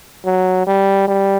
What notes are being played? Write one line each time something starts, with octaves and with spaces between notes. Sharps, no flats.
F#3
G3
G3